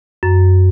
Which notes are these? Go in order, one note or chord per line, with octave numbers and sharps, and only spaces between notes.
F#2